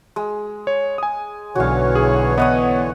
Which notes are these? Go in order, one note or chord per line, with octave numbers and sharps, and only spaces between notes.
G#3
C#5
G#5 D#6
B1 D3 E3 F#4 C#5 F5
G#4
B3 D#5 F#5 D#6